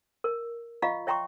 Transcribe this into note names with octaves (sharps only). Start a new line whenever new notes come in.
A#4
F4 D#5 F5 A#5 C#6
C#5 E5 G5 A#5 C6 C#6